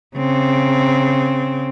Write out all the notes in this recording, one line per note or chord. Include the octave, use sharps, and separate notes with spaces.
C#3 C4